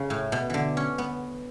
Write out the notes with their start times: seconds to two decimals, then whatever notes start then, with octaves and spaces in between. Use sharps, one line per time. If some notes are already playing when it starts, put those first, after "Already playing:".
Already playing: C#3
0.10 A2
0.32 B2
0.50 D3 E3
0.77 C#4
0.98 B3